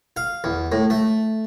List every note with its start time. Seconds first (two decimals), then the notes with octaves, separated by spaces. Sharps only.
0.17 F5
0.44 E2
0.72 A2
0.90 A3